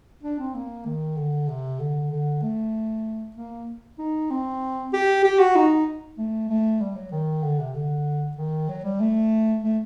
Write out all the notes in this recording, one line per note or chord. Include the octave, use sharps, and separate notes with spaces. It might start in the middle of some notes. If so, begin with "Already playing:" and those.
D4
C4
A#3
D#3
D3
C3
D3
D3
A3
A#3
D#4
C4
G4
G4
F#4
D#4
A3
A3
G3
F#3
D#3
D3
C3
D3
D#3
F#3
G3
A3
A3